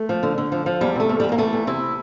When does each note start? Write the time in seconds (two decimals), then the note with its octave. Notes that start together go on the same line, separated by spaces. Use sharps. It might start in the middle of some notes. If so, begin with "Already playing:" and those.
Already playing: A3
0.09 F3
0.23 D3
0.38 D3
0.52 F3
0.66 F3
0.81 E2 G3
0.96 C3 A3
1.09 E2
1.20 E2 G3
1.32 A#3
1.38 E3 A3
1.53 E2
1.67 C3 E4